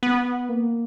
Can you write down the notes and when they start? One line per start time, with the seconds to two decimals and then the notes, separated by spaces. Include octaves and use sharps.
0.03 B3
0.49 A#3